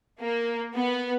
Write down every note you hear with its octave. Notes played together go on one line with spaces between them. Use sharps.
A#3
B3